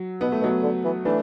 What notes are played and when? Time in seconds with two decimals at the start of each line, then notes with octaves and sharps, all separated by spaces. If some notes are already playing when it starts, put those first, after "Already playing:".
Already playing: F#3
0.21 B2 B3
0.32 A3
0.42 B2 F#3 B3
0.63 D3
0.85 E3
1.05 E3 A3 D4